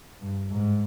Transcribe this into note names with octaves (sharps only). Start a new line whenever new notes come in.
G2
G#2